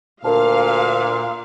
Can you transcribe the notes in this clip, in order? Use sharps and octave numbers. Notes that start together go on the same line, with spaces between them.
D2 A#2 A#4 F5 A5